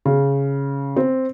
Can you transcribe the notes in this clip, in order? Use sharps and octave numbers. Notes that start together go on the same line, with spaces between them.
C#3
C4